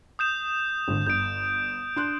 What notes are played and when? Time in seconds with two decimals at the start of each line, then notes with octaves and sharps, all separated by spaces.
0.19 D#6 G6 E7
0.88 G#1 D3
1.07 G1 G6 D7
1.96 D4 C6 F#6